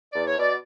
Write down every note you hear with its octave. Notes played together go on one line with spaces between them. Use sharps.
E2 D5
C#5
B2 D5